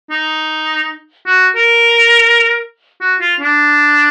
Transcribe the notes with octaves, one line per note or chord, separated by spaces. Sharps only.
D#4
F#4
A#4
F#4
F4
D4